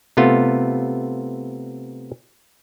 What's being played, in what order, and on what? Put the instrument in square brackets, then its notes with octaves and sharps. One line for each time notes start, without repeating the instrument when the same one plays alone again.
[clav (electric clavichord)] C3 A3 B3 F4